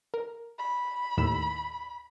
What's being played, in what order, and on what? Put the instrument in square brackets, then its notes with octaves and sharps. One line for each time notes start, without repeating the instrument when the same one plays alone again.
[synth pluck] A#4
[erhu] B5
[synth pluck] D#2 A2 E6